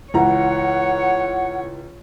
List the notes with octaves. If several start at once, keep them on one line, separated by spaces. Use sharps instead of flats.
C#2 E3 C#5 F#5 A#5